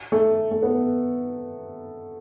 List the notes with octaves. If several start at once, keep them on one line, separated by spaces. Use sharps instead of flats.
A3
A3
B3